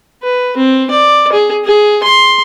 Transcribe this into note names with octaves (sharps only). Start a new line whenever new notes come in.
B4
C4
D5
G#4
G#4
C6